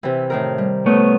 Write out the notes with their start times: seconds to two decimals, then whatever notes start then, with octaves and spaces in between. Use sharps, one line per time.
0.03 C3 E3
0.30 A2 D#3 A#4
0.58 G3
0.86 A3 B3 C#5